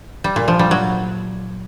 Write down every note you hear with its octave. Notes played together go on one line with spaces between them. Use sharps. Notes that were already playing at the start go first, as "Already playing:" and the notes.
G3
A#2
F3
G3
F#3